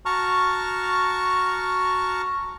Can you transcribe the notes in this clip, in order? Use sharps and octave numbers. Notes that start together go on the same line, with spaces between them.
F#4 A5 A#5 C#6 F6